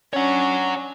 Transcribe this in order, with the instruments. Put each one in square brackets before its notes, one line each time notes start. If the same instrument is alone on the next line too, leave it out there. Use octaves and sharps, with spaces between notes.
[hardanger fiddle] C#4 D4 [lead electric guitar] C#5 F#5